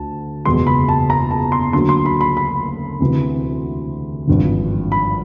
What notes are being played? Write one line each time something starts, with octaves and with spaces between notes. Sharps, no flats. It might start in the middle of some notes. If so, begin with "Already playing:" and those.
Already playing: D2 A5
F#1 E2 B2 G#3 B3 C6
B5
A5
A#5
A5
C6
D2 D3 F#3 A#3 C6
C6
B5
B5
B5
D2 C3 E3
G#1 G2 D3 F3
B5